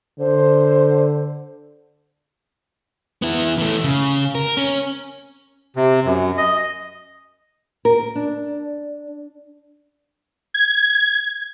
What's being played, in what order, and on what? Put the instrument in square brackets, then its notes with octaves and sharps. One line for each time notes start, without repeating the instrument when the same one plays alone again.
[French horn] D3 [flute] C5
[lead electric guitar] B3 E4
E3 A3
C#3
A#4
C#4
[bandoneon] C3
F#2
D#5
[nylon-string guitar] A#4
D4
[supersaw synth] G#6